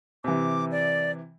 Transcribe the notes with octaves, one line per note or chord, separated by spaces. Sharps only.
C3 E3 D6
D5